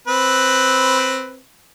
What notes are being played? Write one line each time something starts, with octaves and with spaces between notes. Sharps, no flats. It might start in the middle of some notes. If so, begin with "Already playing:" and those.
C4 B4